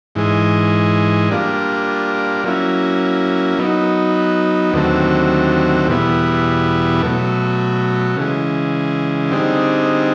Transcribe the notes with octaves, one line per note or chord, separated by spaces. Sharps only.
G#2 E3 G#3
G3 A#3 D4 F4
F#3 A#3 C#4 E4
F#3 B3 D#4
D#2 D3 F#3 A3 C4
E2 B2 G3 B3 E4
B2 F#3 A3
C#3 E3 G#3
D3 G3 C4 D#4 G#4